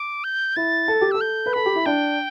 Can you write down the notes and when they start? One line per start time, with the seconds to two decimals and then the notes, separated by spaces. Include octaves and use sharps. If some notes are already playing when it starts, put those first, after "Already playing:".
Already playing: D6
0.24 G6
0.56 E4 A6
0.88 A4
1.01 G4
1.11 A4 E6
1.21 G6
1.46 B4
1.53 A4 B5
1.66 G4
1.75 E4
1.86 D4 G5